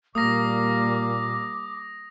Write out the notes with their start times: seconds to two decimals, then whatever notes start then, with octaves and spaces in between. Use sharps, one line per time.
0.15 A#2 G3 A#3 D6 D#6 A#6